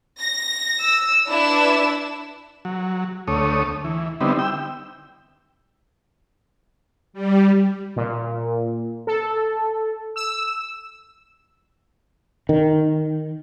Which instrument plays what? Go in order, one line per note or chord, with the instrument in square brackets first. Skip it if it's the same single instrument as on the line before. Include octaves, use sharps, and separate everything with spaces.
[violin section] A#6
[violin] E6
[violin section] D4 E4 B4 [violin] E7
[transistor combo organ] F#3
D2 A3 C#5 D#6
E3
D3 G3 B3 C4 D#4 E4
G5 E6
[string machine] G3
[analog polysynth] A#2
A4
E6
[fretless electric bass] D#3